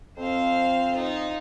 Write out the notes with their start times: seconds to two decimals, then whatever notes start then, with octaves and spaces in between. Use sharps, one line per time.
0.17 F2 C4 C5 F5
0.96 D#4 F4